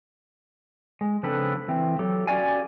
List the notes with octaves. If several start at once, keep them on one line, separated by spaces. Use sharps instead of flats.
G#3
C#3 F3 C4 D4 A4 B4
E3 C4
F#3 G4 A4
C#4 F#4 G4 D5 F5 G#5